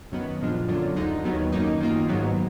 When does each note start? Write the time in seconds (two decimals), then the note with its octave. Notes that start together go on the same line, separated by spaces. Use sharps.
0.12 F#2 D#3 F#3 B3
0.40 A#2 F3 G#3 D4 F4
0.68 F#2 D3 F#3 D4 F4
0.96 D2 D3 G#3 D#4
1.24 D#2 D#3 F#3 B3
1.52 F#2 D#3 A#3 D#4
1.81 D#3 A#3 F4
2.08 G#2 D#3 F#3 B3